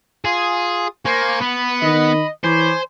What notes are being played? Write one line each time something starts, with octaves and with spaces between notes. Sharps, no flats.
F4 G#4 D#6
A#3 C5 G#5 C#6
B3 B5
D#3 D#5
E3 C5 C#5 G#5 B5 D6